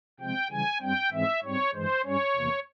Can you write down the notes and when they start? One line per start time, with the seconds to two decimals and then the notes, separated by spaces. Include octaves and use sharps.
0.20 C3 F3 G#3 C4 G5
0.50 C#3 E3 G3 G#5
0.81 G2 G3 C4 G5
1.12 G#2 E3 G#3 C4 E5
1.43 G#2 G3 C4 C#5
1.74 G2 E3 G#3 C5
2.04 G2 G3 C#4 C#5
2.36 E2 C3 E3 A#3